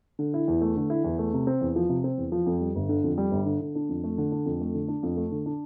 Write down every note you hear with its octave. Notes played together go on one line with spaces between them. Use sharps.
D3
E4
E2
A3
D3
E4
E2
A3
C3
C4
E2
F3
C3
C4
E2
F3
F2
G3
G1
D3
F2
G3
G1
D3
D3
D4
F2
A3
D3
D4
F2
A3
D3
D4
F2
A3
D3
D4